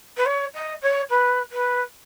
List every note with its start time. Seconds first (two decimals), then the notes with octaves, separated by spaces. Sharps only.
0.17 B4
0.26 C#5
0.54 D#5
0.82 C#5
1.10 B4
1.51 B4